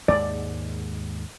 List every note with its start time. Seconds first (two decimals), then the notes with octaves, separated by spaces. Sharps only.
0.08 D#2 G#2 G#3 D5